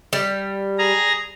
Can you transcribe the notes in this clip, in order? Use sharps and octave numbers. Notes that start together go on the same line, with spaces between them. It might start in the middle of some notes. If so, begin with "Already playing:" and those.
G3
G#4 A#5